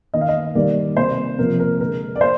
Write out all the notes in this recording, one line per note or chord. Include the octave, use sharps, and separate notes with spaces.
D#3 A#3 D#5
F5
D#5
D#3 G3 A#3 D5
C3 G3 A#3 C5
C3 F3 A#3 A#4
A#4
D3 G#3 A#4
D5
A#3 C5